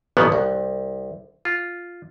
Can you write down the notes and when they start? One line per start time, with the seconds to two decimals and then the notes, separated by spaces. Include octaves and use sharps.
0.17 A1 A#2 C#3 F3 B3
0.32 C2
1.45 F4